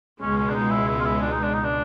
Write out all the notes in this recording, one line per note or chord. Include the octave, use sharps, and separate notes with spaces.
C#2 B2 G#3 C#4
C#4
D4
D#4
E4
E4
F4
E4
D4
D#4
D4
D#4
D4